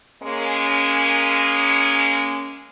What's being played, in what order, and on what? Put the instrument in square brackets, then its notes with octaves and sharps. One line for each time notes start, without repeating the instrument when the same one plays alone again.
[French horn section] G#3 A#3 C#4